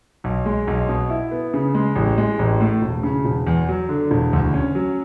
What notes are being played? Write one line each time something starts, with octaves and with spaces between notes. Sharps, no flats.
B1
G#3
B1
B2
E4
B3
C#3
G#3
A1
G#3
A1
A2
E1
C#3
E1
E2
F#3
D3
E1
D2
C#4
F#3